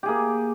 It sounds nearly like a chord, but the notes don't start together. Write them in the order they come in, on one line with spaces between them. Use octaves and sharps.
G4 G#4 A#3